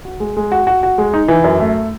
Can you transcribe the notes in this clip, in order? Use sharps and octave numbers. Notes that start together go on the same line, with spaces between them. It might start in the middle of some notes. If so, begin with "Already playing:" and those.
F#4
G#3
G#3
F#4
F#4
F#4
G#3
D#4
E3
F#2
A3